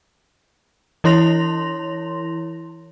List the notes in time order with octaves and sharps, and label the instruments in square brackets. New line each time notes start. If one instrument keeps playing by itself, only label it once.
[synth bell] E3 E4 C#5 C6 A#6 F7